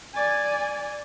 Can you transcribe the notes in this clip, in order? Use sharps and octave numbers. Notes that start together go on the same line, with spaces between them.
D5 G#5